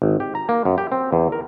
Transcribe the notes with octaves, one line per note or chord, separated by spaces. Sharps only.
G#1
G4
A#5
A#3
F#2
G4
C4
E2
A#4